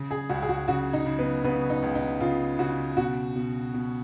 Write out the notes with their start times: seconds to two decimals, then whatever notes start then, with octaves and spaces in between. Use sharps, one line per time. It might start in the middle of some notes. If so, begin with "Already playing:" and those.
Already playing: C#3
0.11 G#4
0.29 C#2 F#4
0.42 G#4
0.49 F#4
0.68 C#3 F#4
0.93 D#4
1.06 C#3
1.19 B3
1.44 C#3 B3
1.70 D#4
1.83 C#2
1.95 D#4
2.20 C#3 F4
2.59 C#3 F#4
2.97 B2 F#4
3.36 B2
3.74 B2